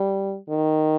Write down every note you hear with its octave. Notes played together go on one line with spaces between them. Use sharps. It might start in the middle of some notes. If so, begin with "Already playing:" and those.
Already playing: G3
D#3